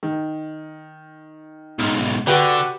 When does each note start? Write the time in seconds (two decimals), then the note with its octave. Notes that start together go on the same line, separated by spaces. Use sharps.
0.03 D#3
1.79 B1 G#2
2.27 D3 F#4 G4 B4